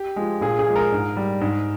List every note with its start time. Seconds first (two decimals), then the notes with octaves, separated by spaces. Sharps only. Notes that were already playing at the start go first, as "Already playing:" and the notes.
Already playing: G4
0.16 F3 G#3
0.41 A#2 G#4
0.59 G#4
0.66 F3 G#3
0.76 A#4
0.92 G#2
1.16 G3
1.41 G#2